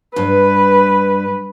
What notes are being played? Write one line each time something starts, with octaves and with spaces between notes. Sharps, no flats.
G2 B4